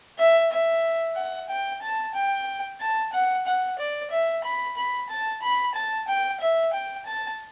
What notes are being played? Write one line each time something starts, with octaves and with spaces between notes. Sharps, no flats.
E5
E5
F#5
G5
A5
G5
A5
F#5
F#5
D5
E5
B5
B5
A5
B5
A5
G5
E5
G5
A5